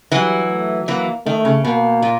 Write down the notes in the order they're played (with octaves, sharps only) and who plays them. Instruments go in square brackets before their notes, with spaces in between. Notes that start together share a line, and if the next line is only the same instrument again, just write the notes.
[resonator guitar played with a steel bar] E3 F#3 [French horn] G3
[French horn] A3
[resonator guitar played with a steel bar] E3 F#3 [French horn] A#3
[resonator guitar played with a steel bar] D#3 [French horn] A3
[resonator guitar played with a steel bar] C#3
[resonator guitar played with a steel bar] B2 [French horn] A#3
[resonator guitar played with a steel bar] A#2